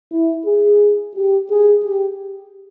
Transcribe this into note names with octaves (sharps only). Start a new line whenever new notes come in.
E4
G#4
G4
G#4
G4